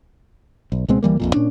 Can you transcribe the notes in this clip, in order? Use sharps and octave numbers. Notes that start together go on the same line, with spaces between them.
B1
C#2 B2 G#3 C4
D2 E3 G3 A#3
A#1 F2 A#2
A#2 C#4 D4